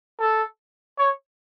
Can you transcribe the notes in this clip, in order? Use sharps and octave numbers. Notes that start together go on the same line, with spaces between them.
A4
C#5